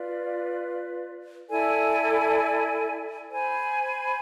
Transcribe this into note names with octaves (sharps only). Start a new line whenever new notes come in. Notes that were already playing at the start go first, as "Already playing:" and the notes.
Already playing: F4 B4 D5
E4 A4 D5 G#5
C5 G#5 B5